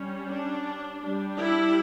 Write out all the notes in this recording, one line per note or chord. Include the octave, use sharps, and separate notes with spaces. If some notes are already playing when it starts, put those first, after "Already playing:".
Already playing: G3 C#4
D4
G3 D4
E4